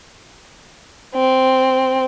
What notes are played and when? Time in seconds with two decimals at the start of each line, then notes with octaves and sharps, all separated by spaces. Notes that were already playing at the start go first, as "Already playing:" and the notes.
1.15 C4